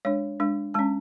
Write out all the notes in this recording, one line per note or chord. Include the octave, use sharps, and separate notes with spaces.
G#3 D4 C#5
G#3 D4
G#3 C#4 A5